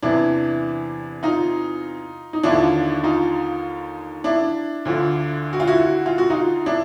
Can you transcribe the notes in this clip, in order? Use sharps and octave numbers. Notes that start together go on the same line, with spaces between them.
E2 C3 E3 D4 E4
D#4 F4
D#4
D#2 D3 F3 D4 E4
D#4 F4
D4 E4
D2 D3 F3
F#4
F4
E4 F#4
F4
F#4
D#4 F4
D4 E4